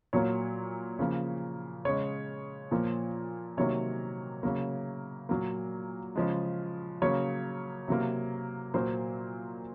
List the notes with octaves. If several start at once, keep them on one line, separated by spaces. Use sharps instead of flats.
A#2 F#3 A#3 C#5
C#3 F3 A#3
C#3 G#3 C#5
A#2 F3 A#3
C3 D#3 F#3 A#3 C#5
C#3 F#3 A#3
A#2 F#3 A#3
C#3 F3 G#3
C#3 F#3 A#3 C#5
C3 F#3 A#3
A#2 F#3 A#3 C5